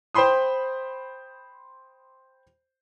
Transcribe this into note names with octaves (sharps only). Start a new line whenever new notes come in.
C5 G5 B5 C6 D#6